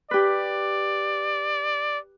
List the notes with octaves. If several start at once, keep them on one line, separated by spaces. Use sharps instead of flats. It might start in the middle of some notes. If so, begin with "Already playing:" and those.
G4 B4 D5